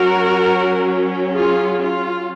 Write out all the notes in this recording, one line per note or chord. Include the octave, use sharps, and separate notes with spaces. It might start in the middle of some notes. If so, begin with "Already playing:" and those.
Already playing: F#3 C#4 F#4 A#4
F4 G#4
F4